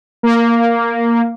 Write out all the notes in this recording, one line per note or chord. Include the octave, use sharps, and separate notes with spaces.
A#3